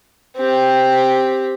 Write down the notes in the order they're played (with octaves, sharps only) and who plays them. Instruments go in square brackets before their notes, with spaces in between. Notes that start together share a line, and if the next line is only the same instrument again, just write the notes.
[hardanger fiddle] C4 G4